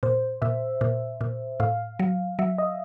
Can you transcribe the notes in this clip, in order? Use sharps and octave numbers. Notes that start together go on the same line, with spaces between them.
A#2 C5
A#2 E5
A#2
A#2
A2 F5
F#3
F#3 E5
D#5